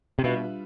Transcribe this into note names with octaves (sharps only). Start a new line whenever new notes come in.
C3
B2 G3 D4 F4 B4 E5